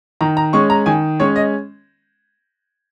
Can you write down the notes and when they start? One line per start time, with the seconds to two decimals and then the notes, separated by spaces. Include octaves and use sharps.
0.21 D#3 A#5
0.37 A#5
0.53 G#3 C#4 C#6
0.70 A#5
0.86 D#3 G#5
1.20 G#3 C#4 C#5
1.36 D#5